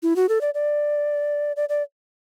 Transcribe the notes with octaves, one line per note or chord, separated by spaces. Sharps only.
E4
F#4
A4
D5
D5
D5
D5